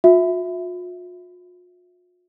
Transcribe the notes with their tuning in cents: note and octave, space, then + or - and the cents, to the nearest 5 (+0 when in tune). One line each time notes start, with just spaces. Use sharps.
F4 +45 E5 +0